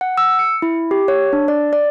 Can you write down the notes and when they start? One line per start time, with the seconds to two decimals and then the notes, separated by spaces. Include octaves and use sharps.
0.01 F#5
0.18 E6
0.39 C#7
0.62 E4
0.91 G4
1.08 C#5
1.33 D4
1.48 D5
1.73 D5